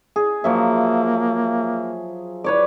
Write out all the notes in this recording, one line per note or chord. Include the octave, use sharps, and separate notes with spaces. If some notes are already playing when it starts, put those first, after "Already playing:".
G#4
F3 F#3 A#3 E5
B4 C#5 D5